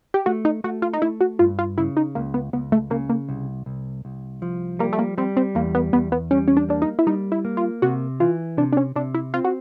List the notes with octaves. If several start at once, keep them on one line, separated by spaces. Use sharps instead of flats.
G4
A3 F#4
D#4
A3 F#4
F4
D#4
A3 E4
F#4
G2 F4
F4
C#3 E4
D#4
C#2 A#3
B3
C#2 B3
A3
C#3 A#3
A#3
C2
C2
C2
F3
G3 A#3
A3
A#3
G3 C4
C4
E2 A#3
B3
E2 B3
B3
G3 C#4
C#4
D4
A#3 D4
D#4
E4
G3 D#4
E4
A#3
F4
C3 F#4
E3 F4
C3 D4
D4
C#4
C3 D4
E4
C4 F4
F#4